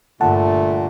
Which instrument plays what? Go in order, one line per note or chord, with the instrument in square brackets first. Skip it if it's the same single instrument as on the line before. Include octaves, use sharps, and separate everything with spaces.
[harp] G1 G2 [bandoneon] A#2 [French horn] A3 [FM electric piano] F#5 A5